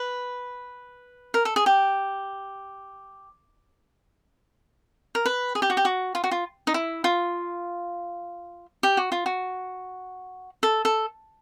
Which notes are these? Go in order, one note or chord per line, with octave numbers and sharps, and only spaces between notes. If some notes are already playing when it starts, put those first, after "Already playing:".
Already playing: B4
A#4
A4
G#4
G4
A#4
B4
G#4
G4
F#4
G4
F#4
F4
F#4
F4
D#4
E4
F4
G4
F#4
F4
F#4
A4
A4